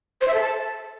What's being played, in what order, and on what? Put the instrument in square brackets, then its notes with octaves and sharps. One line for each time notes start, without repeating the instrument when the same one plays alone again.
[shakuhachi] C5
E5
A4
A5